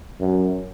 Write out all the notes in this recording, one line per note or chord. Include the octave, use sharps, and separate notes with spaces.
F#2